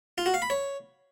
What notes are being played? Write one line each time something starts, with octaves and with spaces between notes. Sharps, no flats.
F4
F#4
F5
B5
C#5